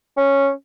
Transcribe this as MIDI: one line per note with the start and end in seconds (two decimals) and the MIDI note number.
0.17 0.50 61